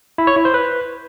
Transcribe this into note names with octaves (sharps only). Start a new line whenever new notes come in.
E4
C#5
E4
C5
B4